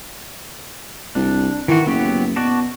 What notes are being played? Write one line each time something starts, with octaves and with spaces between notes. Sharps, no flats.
C2 D4
D#3 E3 F#4
F#1 F#3 B3 G4
B2 F#4 D5 A5